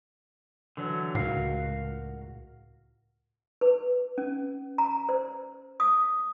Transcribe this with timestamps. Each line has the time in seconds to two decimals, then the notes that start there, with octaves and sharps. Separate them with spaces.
0.77 D3 E3 F#3
1.15 C#2 A2 F#4 A#4 F5
3.61 B4
4.18 C#4
4.78 A#5
5.09 C5
5.80 D#6